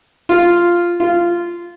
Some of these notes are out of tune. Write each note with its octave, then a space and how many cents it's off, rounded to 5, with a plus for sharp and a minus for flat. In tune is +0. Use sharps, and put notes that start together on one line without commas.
F4 -5
F4 -15